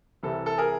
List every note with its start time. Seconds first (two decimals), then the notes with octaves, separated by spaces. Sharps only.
0.23 C2 C3 E3 A4
0.46 A4
0.58 G#4 A#4